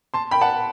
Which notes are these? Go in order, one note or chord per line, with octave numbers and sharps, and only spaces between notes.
A5 C6
G5 B5
F#5 A5